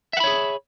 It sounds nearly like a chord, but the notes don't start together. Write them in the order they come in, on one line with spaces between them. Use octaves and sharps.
E5 F#5 B5 C#5 G#4